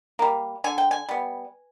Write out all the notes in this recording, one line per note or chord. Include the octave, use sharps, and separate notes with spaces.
G3 A#3
D3 G#5
G5
G#5
G3 B3